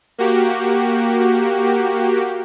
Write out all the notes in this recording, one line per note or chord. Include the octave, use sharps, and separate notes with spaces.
A#3 F#4 G4